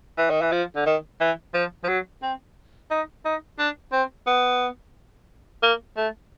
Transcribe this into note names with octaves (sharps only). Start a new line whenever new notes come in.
E3
D#3
E3
F3
D3
D#3
E3
F3
F3
F#3
C4
D#4
D#4
D4
C4
B3
A#3
A3